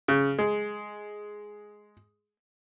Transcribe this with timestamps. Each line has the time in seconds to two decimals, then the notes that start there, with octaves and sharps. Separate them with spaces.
0.08 C#3
0.39 G#3